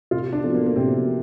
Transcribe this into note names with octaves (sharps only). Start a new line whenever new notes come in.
C3 F4
D4
F3 C4 F4 A4
A#3
A#3
C3 C4